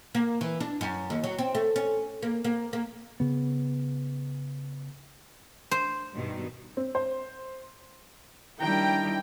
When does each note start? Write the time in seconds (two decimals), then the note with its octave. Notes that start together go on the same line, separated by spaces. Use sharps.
0.15 A#3
0.41 E3
0.60 D4
0.81 F#2
1.10 D#2
1.24 F#3
1.39 C4
1.55 A3
1.76 C#4
2.23 A#3
2.44 A#3
2.73 A#3
3.20 C#3 B3
5.71 C5
6.13 G2 B2 D#3
6.77 C4
6.95 C5
8.61 D#3 G3 D4 E4 G5 A#5